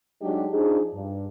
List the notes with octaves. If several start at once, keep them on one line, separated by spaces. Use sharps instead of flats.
F#3 G#3 D4 D#4 F#4 G4
F3 D4 D#4 G#4
G2